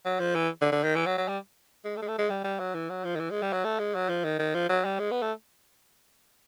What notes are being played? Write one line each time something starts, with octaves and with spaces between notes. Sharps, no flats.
F#3
F3
E3
D3
D3
D#3
E3
F#3
F#3
G3
G#3
A3
G#3
A3
G#3
G3
G3
F#3
E3
F#3
F3
D#3
E3
G#3
G3
F#3
A3
G#3
F#3
F3
D#3
D#3
F3
F#3
G3
G#3
B3
A3